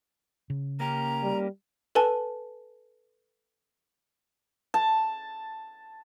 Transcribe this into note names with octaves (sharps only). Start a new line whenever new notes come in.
C#3
A#3 C#4 G4 A#5
G3
A4 B4 G#5 A5
A5